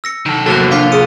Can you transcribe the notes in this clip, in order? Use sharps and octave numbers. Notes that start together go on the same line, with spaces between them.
E6 A#6 C#7
D#3 A4
E2 C3 F#3 A#3 A4 A5 F#6
D4 F4 D6 B6 C#7
G#4 D#6 C#7 D#7